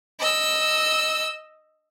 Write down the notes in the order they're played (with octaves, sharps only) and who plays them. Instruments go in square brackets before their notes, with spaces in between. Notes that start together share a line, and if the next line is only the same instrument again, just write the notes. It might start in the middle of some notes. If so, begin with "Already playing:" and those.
[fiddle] D#5 E6